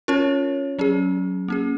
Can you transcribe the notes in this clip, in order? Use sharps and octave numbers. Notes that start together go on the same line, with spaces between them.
C#4 F4 A#4 C#5
F#3 C#4 G#4
A#3 C#4 G#4